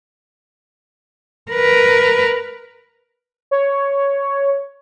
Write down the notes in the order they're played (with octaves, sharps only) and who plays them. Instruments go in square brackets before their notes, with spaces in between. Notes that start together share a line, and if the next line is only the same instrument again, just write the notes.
[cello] A#4 B4
[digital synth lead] C#5